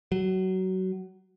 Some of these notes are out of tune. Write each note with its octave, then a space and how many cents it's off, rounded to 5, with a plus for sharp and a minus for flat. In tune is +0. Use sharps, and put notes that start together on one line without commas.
F#3 +20